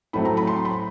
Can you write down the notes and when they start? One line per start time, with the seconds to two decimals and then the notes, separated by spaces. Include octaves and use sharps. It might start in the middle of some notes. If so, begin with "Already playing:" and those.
0.13 A2 F#3 A3 C4 B5
0.25 A#5
0.37 B5
0.47 C6
0.65 B5